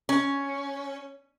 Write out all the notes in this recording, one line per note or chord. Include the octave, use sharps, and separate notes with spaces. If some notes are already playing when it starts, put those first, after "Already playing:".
C#4